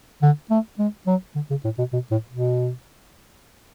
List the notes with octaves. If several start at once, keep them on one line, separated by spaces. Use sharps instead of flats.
D3
A3
G#3
F#3
D3
C#3
A2
B2
B2
A2
B2